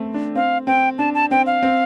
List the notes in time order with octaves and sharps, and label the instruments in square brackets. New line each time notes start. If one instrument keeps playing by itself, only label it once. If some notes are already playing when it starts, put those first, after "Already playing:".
Already playing: [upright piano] A3 C4
D4
[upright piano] C4 [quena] F5
[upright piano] C4 [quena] G5
[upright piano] D4 [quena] A5
[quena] A5
[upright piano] C4 [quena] G5
[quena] F5
[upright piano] C4